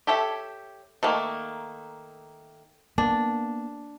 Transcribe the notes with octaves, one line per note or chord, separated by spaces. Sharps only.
G4 A4 C#5 E5
D#3 A3 A#3
A#3 B3 D4